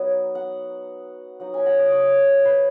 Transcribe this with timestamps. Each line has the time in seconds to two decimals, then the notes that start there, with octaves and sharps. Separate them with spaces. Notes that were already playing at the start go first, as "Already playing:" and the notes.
Already playing: F#3 B3 D#4 D#5
0.35 F#5
1.40 F#3 D#4 F#5
1.54 G#5
1.66 F#5
1.79 D#5
1.92 C#5
2.45 B4